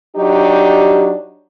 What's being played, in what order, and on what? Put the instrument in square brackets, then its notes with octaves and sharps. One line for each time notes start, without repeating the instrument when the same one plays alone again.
[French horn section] F#3 D4 D#4 G4